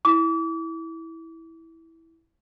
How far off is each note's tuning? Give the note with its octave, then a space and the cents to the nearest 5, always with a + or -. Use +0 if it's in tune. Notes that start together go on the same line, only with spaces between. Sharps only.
E4 -10 D6 -35